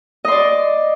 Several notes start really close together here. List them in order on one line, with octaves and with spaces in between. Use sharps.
D#5 C6 D5